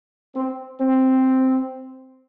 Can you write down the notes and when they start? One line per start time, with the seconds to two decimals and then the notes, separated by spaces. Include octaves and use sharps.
0.36 C4
0.81 C4